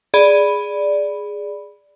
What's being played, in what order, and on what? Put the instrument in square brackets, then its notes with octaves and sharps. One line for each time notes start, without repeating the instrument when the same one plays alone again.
[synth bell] G#4 D5 B5